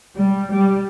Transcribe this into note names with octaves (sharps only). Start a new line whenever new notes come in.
G3
G3